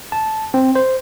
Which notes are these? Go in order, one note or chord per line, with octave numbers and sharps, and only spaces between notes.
A5
C4
C5